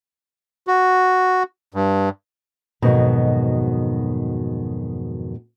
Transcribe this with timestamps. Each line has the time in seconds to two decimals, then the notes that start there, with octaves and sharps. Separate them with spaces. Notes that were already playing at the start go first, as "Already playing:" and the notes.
0.67 F#4
1.74 G2
2.82 F2 G#2 B2 D#3 F#3